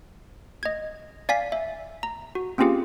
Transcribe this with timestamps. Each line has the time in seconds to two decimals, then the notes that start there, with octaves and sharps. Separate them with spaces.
0.63 D#5 G#6
1.29 D5 F5 G#5 B6
1.52 E5
2.03 A#5
2.35 F#4
2.58 A#3 C4 C#4 F4 G4 G#4